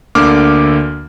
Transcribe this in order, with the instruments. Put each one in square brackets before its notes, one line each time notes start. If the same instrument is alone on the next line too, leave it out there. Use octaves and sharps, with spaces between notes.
[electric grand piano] D2 D3 A#3 D6 F6